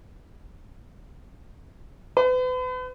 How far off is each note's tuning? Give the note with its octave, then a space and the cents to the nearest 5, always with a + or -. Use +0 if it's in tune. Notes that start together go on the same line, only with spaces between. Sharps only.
B4 +40